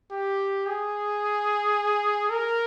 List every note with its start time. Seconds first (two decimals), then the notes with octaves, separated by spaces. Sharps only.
0.11 G4
0.66 G#4
2.30 A#4